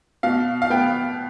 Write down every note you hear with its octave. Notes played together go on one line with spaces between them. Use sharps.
B2 F5
F5
B3 G5